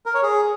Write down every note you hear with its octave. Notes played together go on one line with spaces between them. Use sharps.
A#4
C#5
G#4